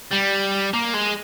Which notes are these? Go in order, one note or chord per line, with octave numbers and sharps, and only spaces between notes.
G3
A#3
G#3